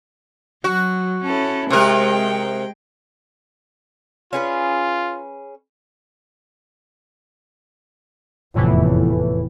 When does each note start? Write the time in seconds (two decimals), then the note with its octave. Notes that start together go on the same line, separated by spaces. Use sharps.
0.64 F#3 F#4
1.25 C#4 E4 A4
1.70 C3 G#3 A#4 G5
4.33 C#4 F4 G#4 B4
8.55 F1 E2 A2 E3